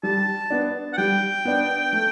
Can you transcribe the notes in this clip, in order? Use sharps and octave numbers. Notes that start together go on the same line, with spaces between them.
G3 A5
B3 D4
F#5
G3 G5
B3 D4
A3